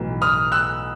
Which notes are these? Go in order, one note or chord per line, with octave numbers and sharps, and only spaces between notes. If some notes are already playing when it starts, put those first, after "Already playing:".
Already playing: B1 A2 E3
D#6 F6
E6 F#6